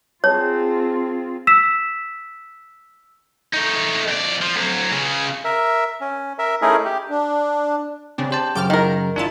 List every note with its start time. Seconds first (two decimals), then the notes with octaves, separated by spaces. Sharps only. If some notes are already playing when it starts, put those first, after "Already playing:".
0.24 C4 F4 G#4 C#5 A5
1.47 E6 B6 E7
3.54 A3 D#4
4.08 F2 D5
4.42 F3
4.56 D2 F#3
4.91 C#2 C#3
5.45 A#4 E5
6.01 C#4
6.39 A#4 E5
6.62 A3 C#4 D#4 E4 G#4 A#4
6.85 G4
7.10 D4
8.18 C#3 C4 D4
8.31 G4 C5 A5
8.55 F#2 C#3 G5 D6 F6
8.70 D#3 A#4
9.16 G#1 D4 E4 F4 A5